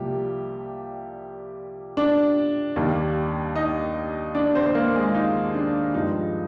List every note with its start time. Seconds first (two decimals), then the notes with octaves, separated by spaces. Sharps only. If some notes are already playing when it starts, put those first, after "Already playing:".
Already playing: C2 C3 F3 G3 A#3 G4
1.97 D4 D5
2.76 D#2 D#3 G3 A#3
3.56 D#4 D#5
4.35 D4 D5
4.55 C4 C5
4.66 C5
4.74 A#3 A#4
4.95 G#3 G#4
5.09 F4
5.15 D#4
5.55 D4
5.94 G2 F3 G#3 D#4